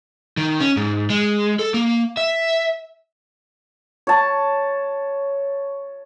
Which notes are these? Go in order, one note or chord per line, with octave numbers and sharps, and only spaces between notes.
D#3
C#4
G#2
G#3
A4
A#3
E5
C#5 A5